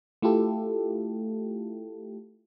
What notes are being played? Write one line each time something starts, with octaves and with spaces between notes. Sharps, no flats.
A3 E4 F4 G4 A4